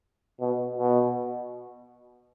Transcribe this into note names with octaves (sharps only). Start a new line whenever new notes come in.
B2
B2